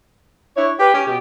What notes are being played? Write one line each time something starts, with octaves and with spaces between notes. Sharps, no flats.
D4 E4 C#5
G4 B4
C#4 G4
B2 G4